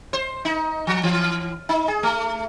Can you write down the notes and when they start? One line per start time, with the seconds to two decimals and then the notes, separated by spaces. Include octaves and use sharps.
0.13 C5
0.45 D#4
0.87 F3
1.03 E3
1.69 D#4
1.88 G#4
2.03 A3